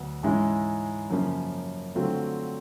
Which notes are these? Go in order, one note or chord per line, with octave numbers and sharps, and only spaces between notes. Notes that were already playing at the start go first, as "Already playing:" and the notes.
Already playing: D2 F#3 B3
G#2 E3 G#3 C#4 E4
F#2 C#3 F3 A#3 C#4
D3 F#3 A3 C4 F4